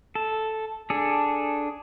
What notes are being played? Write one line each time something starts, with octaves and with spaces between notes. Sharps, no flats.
A4
D4 G#4 A4